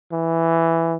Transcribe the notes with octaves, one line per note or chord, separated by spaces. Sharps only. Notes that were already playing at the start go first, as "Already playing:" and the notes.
E3